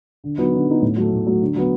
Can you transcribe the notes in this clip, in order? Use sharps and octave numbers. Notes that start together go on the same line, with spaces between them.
D3
F#3 B3 D#4
D3
F#3 B3 D#4
A2
F#3 A3
A2
F#3 A3
D3
F#3 B3